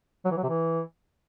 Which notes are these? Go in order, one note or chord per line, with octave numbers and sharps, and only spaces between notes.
F#3
E3
F#3
C3
E3